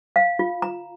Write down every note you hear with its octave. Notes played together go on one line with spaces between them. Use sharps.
F5
F4
A#5